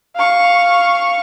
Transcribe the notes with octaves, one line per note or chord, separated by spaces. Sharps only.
F5 C#6